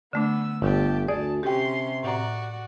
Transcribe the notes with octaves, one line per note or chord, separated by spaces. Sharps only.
D3 A3 B3 D4 E6
G1 G4 A5
D2 G#4 D5 A5
C3 C#4 G4 G5 C6
A2 F#4 D5 A#5